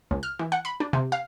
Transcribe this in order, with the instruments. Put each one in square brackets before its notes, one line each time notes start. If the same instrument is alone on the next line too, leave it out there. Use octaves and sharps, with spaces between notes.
[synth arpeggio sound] C#2
F6
E3
F#5
B5
D4
C3
F5